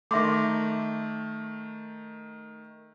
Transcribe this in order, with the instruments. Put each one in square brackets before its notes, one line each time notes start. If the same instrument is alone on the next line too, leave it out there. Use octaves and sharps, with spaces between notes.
[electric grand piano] D#3 A3 [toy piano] E5 C6 D6